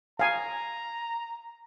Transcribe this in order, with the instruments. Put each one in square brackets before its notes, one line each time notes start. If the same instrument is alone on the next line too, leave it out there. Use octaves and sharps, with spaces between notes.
[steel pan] F5 G#5 [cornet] A#5